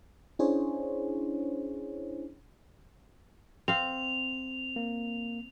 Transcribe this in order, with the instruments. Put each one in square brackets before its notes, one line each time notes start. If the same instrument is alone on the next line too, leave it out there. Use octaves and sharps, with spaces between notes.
[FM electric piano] C#4 D4 E4 G#4 C5 C#5
[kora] C4 F5 [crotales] F7
[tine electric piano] A#3